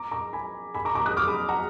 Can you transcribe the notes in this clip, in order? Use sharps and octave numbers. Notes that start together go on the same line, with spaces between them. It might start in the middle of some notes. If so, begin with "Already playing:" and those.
Already playing: A#5 D6
A#5 D6
G#5 B5
G#5 B5
A#5 D6
A#5 D6
D#6 F#6
D6 F6
B5 D#6
F#5 A#5